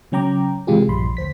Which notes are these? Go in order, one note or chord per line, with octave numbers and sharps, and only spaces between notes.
C#3 F#3 C#4 G5 A#5 D6
C3 E3 G#3 F4 G4 G#4
A#1 G2 F3 B5 C6
D2 C5 B6